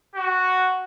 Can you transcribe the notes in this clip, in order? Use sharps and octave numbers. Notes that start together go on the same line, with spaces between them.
F#4